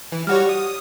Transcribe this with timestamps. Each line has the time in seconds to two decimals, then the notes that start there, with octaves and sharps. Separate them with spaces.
0.12 E3
0.27 G3 F#4 G4 C#5 F6
0.49 G4 F#5 D#6